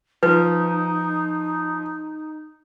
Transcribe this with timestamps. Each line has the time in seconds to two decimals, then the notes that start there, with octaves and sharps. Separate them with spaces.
0.23 F3 D#4 B4